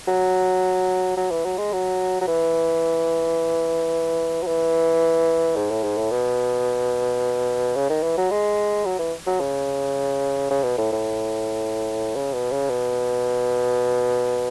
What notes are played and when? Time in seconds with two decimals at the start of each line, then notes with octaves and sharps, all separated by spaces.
0.08 F#3
1.17 F#3
1.31 E3
1.45 F#3
1.58 G#3
1.73 F#3
2.21 F#3
2.27 E3
4.42 F#3
4.47 E3
5.56 G#2
5.71 A2
5.84 G#2
5.97 A2
6.11 B2
7.76 C#3
7.90 D#3
8.03 E3
8.18 F#3
8.31 G#3
8.85 F#3
8.99 E3
9.27 F#3
9.40 C#3
10.51 C#3
10.63 B2
10.78 A2
10.92 A2
12.15 C#3
12.33 B2
12.52 C#3
12.70 B2